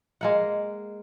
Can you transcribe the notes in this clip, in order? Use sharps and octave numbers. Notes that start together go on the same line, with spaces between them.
G#3 A#3 F#5